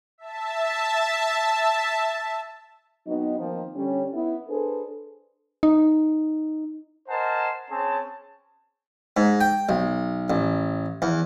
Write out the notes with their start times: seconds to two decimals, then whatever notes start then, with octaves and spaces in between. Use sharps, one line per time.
0.18 E5 A5
3.07 F#3 B3 C4 D#4
3.40 D#3 F3 A#3 C4
3.76 D3 G3 C#4
4.14 B3 E4
4.48 D4 G#4 A4 B4 C5
5.63 D#4
7.09 A#4 C5 D#5 F#5 G#5 A5
7.70 C4 C#4 G#4 A5
9.17 G#2
9.41 G5
9.69 B1
10.30 A1
11.02 E2